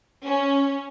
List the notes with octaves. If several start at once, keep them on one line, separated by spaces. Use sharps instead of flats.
C#4